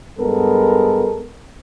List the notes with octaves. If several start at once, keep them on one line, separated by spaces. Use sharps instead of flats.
G2 G#3 B3 A4 A#4